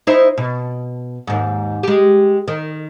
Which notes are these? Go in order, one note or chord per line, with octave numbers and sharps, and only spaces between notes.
D#4 E4 C5
B2
D#2 G#2
G#3 G4
D#3